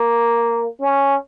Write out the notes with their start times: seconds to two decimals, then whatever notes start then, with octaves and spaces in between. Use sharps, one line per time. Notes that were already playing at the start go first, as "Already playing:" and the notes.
Already playing: A#3
0.80 C#4